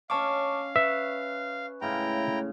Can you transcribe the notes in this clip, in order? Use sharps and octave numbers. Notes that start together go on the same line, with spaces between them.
C#4 C#5 D#5 F5 A5 C#6 D6
B4 E5
A2 C#3 G#3 E4 G5 A#5